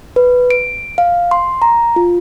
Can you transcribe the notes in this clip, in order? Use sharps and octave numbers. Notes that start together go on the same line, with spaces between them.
B4
D7
F5
C6
A#5
F4